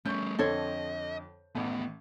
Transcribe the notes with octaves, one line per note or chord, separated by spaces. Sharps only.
G3 A3 C#4 C#6 G6
F2 D3 F3 A4 C5 C#5 D#5
A1 D#2 A2 B3